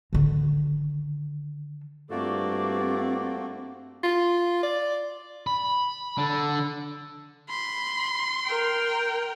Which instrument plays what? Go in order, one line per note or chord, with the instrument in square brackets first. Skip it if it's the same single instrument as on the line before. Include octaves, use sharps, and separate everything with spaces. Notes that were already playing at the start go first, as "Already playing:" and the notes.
[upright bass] D3 D#3
[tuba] G2 [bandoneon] A3 A#3 F#4 [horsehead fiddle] C4 [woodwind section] F4 A4 D5
[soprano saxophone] F4
D5
[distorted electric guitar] B5
D3
[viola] B5 [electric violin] C6
[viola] A#4 G5